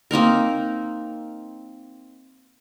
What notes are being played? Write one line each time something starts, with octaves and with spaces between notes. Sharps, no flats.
A#3 C4 D#4 A#4